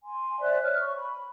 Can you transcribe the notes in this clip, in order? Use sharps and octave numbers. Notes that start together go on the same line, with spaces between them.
G#5 C6
C5 D5 E5 F#6
C#5 F6
C#6
B5